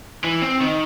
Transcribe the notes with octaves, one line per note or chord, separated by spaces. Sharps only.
E3
C4
D#3